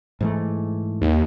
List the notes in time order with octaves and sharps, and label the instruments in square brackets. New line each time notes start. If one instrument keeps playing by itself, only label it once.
[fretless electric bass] G#2 E3 A3
[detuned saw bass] D#2